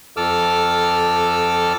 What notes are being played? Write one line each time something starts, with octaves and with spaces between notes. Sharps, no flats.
F2 A4 D6 E6 F6